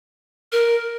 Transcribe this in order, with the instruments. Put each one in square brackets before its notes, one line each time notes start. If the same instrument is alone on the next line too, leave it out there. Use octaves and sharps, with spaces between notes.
[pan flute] A#4